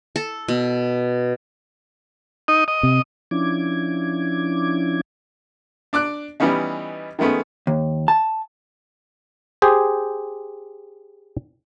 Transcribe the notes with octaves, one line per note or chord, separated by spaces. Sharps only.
A4
B2
D#4 D#5
D#5
C3
F3 C#4 D4 E4 D6 G#6
D4 D5 D6 F#6
E3 G3 B3 C#4 D#4
D#3 G#3 A3 B3 C#4
D#2
A5
G4 G#4 C5